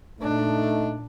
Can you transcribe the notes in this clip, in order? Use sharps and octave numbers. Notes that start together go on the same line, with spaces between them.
A#2 A3 D4 D#4